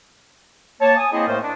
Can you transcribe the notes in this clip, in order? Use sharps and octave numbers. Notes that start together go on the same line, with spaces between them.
A#3 C#5 A5
G#5 D#6
A#3 C4 E4 G#4 C5 D#5
A2 A3 A#3 A#4 C5
D4